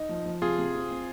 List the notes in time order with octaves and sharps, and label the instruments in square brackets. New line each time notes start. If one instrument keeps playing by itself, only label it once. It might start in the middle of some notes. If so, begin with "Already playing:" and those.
Already playing: [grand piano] D#4
F3
F3
[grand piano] C3 [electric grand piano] F4 G#4
[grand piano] C3
C4
C4